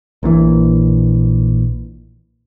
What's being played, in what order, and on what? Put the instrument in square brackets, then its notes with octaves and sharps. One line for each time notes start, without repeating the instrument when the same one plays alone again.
[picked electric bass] A#1 A#2 C#3 E3